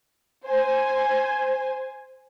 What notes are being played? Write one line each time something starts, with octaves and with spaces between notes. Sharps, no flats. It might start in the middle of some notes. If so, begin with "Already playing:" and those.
C5 G#5